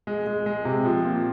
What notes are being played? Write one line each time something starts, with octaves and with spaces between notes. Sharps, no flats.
G#3
G#3
G#3
C3
F3
A#2